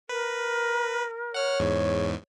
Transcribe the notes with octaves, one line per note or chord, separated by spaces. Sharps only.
A#4 B4
C#5 F#5 F6
E2 G#2